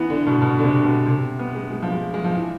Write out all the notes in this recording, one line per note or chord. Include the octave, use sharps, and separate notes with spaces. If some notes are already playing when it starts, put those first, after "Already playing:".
Already playing: E3 B3
D3
B2
B2
D3
C3
B2
C3
B3
G#3
G#3
F3
G#3
G#3
F3
E3